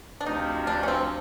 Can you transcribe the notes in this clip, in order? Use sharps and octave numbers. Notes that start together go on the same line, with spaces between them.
D4
D2 C3 F3 D#4
D4
C#4
C4